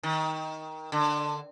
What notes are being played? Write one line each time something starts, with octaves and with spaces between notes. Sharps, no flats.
D#3
D3